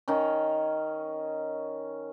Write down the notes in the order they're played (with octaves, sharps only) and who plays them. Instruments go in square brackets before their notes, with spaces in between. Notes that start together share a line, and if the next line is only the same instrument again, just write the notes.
[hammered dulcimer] D#3 C#4